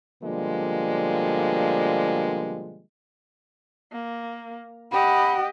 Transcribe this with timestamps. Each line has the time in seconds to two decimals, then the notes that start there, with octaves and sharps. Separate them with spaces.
0.23 B2 D3 F3 G3 G#3 A#3
3.92 A#3
4.92 G4 D#5 F#5 B5